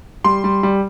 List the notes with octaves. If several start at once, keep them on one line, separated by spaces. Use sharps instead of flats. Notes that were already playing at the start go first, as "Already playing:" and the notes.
G3 C6
G3
G3